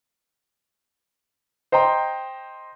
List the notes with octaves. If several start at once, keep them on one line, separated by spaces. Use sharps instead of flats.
C5 D#5 G5 A#5 C6